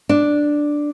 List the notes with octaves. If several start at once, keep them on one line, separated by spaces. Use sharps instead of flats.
D4